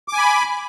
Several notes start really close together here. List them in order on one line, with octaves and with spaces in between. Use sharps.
D6 G#5 B5